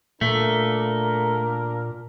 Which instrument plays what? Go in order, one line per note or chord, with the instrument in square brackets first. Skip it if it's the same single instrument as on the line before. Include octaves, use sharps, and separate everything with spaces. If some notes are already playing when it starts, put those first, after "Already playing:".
[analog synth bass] A#2 [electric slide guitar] A3 [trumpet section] A#3 D4 A#4